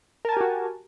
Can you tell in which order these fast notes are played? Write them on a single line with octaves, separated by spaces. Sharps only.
A#4 A5 G#5 G4 F#4